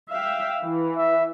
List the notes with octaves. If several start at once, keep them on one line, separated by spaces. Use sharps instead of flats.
E5 F5 G5
E3
E5